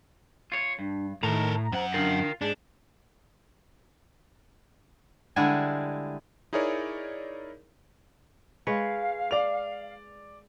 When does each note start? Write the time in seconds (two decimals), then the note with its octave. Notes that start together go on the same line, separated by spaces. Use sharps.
0.52 F4 C#5
0.79 G2 D4
1.23 A2 D#3 A4 A#4 A#5
1.72 F#2 C5 F#5
1.94 D4 F4 A#4 G5
2.41 G#2 D4 G#4
5.36 D3 G3 G#3 D4 E4 G#4
6.53 D#4 E4 G#4 A#4 C#5 D5
8.67 G#3 B4 C#5 F5
9.31 D5 F7